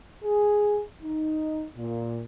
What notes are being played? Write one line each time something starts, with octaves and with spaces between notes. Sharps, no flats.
G#4
D#4
A#2